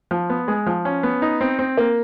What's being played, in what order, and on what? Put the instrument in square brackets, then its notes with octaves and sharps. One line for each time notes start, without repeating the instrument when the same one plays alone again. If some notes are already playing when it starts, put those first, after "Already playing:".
[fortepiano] F3
B3
G#3
F3
C#4
B3
D#4
C4
C4
A#3